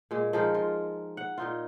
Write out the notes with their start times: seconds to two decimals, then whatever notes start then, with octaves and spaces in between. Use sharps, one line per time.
0.11 A#2 G#3
0.33 F3 G#3 D#4 A#4
0.54 F4
1.17 F#5
1.38 A#2 D#4 F4